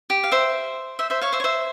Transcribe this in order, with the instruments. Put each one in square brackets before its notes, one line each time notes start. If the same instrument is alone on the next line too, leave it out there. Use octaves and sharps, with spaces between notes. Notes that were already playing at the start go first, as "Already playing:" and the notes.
[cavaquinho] G4
F5
C5 E5
C5 E5
C5 E5
C#5 F5
C5 E5
C#5
C5 E5